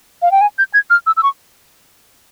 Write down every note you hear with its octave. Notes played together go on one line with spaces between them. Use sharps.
F5
G5
G#5
G6
G#6
F6
E6
E6
C#6